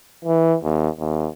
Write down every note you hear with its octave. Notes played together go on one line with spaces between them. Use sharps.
E3
D#2
D#2